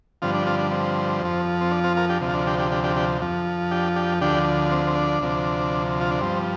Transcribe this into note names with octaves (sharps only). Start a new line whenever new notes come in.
G2 D3 F3 C4 F4
D4
C4 F4
D4
C4
F2 F3
C4
D4
C4 F4
F4 A#4
D4 G4
D2 C3 F3
F4
D4
D4 G4
D4 G4
D4 G4
D4 G4
D4 G4
F2 F3
D4 G4
D4 G4
D2 D3 F3 D4 G4
C4
C4
D4
D2 C3 F3
F4
D4
G2 F3 C4